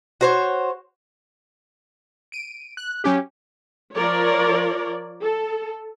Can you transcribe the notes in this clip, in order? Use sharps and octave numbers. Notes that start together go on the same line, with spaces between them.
F#4 C5 C#5
D7 D#7
F#6
F#3 C#4 G4
F3 A#4 C#5 D5
A4